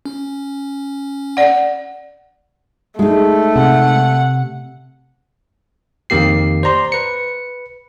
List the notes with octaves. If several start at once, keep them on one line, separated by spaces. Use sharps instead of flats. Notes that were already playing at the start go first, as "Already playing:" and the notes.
C#4
D5 F#5
G#3 A3 D#4
C3 F#5
F2 D#3 A#3 G4 C7
C5 D5 A#5 C6
B4 C#7